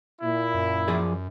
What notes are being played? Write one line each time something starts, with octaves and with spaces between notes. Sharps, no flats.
A#2 E4
F#2
F3 G#4 D5